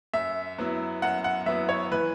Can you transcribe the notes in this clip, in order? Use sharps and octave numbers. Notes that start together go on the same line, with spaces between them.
F#2 E5
F#3 B3 E4
F#2 F#5
F#5
F#3 B3 E4 E5
C#5
E3 B4